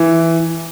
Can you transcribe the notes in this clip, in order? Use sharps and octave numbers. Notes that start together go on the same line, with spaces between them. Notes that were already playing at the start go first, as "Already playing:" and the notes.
Already playing: E3